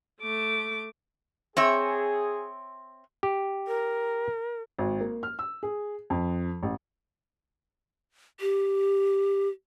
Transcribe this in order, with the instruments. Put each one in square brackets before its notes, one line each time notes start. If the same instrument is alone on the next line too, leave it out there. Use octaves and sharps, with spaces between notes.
[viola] A3 D6
[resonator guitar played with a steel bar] C4 C#5 E5 [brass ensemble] G#4
[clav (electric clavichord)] G4
[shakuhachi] A#4
[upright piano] G#1
A#3
F6
E6
G#4
F2
A1
[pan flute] G4